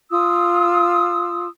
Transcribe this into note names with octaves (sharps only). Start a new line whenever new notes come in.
F4 D#6 E6